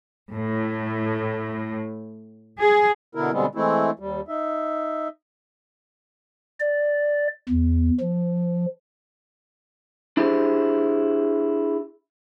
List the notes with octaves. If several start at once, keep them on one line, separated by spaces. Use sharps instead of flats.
A2
G#4
B2 D3 B3 E4 A#4
B2 D3 G3 G#3 B3 C4
E3 G#3 A3 C4 E4
D#2 G3
D#4 E5
D5
E2
F3
D4 E4 G4 G#4 C5